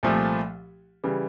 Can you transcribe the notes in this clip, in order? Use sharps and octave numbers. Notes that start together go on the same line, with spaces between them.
C2 A#2 F3 A3
C#3 E3 G3